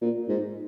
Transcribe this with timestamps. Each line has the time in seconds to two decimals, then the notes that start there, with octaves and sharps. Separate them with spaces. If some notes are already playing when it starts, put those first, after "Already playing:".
0.01 A#2
0.28 G#2